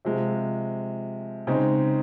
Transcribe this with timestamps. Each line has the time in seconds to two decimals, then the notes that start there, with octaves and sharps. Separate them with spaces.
0.05 C3 F3 G#3
1.47 C#3 G#3 C4 D#4